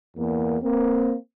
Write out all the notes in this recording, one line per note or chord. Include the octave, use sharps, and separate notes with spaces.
E2 A#3
A#3 C4